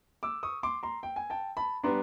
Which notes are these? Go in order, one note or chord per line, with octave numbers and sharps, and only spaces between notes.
D6 E6
C#6 D#6
C6 D6
A#5 C6
G5
G#5
G5 A5
A5 B5
G3 B3 D4 A#5 C6